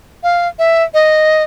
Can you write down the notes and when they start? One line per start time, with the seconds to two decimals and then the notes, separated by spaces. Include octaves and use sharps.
0.23 F5
0.59 E5
0.94 D#5